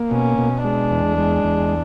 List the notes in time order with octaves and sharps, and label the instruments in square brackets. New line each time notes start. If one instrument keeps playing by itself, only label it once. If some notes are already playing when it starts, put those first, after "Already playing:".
Already playing: [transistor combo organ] A#3
[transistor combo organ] B2 [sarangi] C#4
[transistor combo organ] B2
[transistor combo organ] G#3 [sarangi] D4
[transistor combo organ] E2
G#3
E2